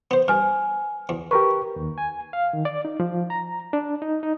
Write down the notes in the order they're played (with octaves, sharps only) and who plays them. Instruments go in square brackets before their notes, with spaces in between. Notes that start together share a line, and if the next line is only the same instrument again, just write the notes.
[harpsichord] B3 C5
[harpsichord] G2 [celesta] G#5 F6
[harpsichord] E2
[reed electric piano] G4 A#4 B4 [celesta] C#6
[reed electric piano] D#2
G#5
F5
D#3
D5
D#4
F3
A#5
D4
D#4
D#4